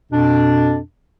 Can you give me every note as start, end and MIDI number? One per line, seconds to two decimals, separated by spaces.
0.12 0.78 41
0.12 0.78 47
0.12 0.78 62